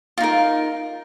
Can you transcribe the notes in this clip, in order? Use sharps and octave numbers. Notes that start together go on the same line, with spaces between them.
D#4 F4 A#4